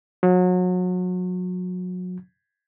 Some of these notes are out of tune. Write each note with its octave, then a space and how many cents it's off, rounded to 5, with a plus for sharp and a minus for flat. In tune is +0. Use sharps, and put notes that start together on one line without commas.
F#3 -30